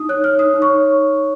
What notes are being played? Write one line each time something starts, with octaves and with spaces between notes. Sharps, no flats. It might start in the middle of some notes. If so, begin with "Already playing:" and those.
Already playing: D#4 D#6
C#5 F#6
C#5 F6
D#4 D#6
D#4
C#6
C#5